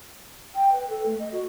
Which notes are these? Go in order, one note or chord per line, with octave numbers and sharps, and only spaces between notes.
G5
B4
A4
A3
D#5
F#4